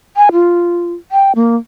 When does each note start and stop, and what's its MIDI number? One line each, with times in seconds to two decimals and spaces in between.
0.17 0.29 80
0.32 0.93 65
1.12 1.32 79
1.35 1.56 58